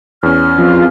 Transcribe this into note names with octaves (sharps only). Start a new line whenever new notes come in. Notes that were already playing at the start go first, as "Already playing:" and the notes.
E2 C#4 F6
F2 F4